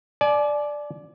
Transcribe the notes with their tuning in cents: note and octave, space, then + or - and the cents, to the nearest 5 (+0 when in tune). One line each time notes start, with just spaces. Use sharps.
D5 +0 G#5 +45